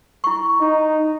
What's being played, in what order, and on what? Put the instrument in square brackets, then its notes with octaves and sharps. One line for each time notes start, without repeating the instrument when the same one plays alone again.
[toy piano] E4 C#6
[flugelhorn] D#4